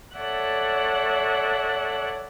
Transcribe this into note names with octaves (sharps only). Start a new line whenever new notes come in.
A4 C#5 D5 E5 F#5 F#6